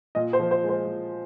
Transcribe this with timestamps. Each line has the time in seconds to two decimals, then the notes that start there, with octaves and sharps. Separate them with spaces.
0.15 A#2 D#5
0.33 C5
0.39 F3
0.51 C5
0.63 G#3
0.69 C5
0.87 A#2